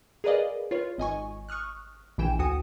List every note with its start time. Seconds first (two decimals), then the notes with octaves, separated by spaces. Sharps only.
0.24 G#4 A#4 B4 D5 D#5 F5
0.71 F4 B4 C#5
0.98 G#1 D#5 G#5 C#6
1.49 C#6 D#6 F6 F#6
2.18 A#1 E3 G5 G#5 E7
2.39 D2 F#4 G#5 D#6 C#7